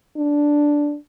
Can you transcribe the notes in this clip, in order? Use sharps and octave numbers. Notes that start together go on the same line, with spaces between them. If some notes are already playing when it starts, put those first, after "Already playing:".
D4